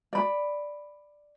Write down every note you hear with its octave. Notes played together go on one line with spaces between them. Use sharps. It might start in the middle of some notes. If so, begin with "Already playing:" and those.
D5 B5